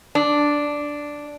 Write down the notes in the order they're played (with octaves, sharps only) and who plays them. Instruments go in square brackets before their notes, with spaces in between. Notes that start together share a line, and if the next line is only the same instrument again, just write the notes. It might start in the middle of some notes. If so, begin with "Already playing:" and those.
[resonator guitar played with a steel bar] D4